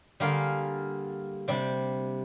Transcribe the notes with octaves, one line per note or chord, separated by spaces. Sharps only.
D3 G3 A#3 F4 G#4
C3 G3 D4